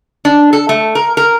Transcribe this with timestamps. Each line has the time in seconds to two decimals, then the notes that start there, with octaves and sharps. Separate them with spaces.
0.25 D4
0.53 A4
0.69 A3
0.95 A#4
1.17 A#4